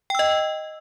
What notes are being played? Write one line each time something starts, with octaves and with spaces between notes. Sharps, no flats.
D#5 G5 E6